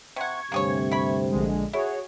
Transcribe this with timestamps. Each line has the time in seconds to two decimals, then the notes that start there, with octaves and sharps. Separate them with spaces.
0.16 C3 F#5 C#6 G#6
0.52 D2 G2 C3 A#3 G#4 C#5
0.91 E4 B5
1.30 A#1 D3 G#3
1.73 E4 F#4 G#4 C#5